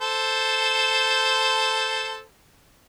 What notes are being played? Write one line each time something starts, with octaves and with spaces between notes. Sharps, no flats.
A4 C5